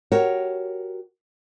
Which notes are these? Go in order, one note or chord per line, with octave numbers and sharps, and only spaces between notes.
F#4 G4 A#4 C#5